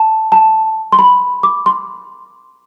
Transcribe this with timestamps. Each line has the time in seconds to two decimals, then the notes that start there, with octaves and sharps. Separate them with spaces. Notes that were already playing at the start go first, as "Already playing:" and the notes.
Already playing: A5
0.32 A5
0.92 C6
0.99 B5
1.43 D6
1.66 C6